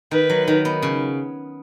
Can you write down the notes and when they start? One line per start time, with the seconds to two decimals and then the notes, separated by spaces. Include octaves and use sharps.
0.11 D#3 B4
0.30 F#3
0.48 D#3
0.65 B3
0.82 C#3